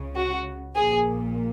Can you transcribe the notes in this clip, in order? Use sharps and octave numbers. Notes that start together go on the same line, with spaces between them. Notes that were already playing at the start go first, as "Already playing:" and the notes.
Already playing: C#2 C#3
F#4
A#1 A#2 G#4